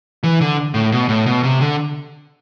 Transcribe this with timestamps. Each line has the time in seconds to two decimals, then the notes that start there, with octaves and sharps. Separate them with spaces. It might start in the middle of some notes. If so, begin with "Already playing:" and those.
0.23 E3
0.41 D3
0.74 A2
0.92 B2
1.09 A2
1.26 B2
1.43 C3
1.60 D3